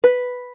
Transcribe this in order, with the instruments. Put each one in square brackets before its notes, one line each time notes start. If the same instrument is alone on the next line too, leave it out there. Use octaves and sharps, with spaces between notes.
[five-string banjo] B4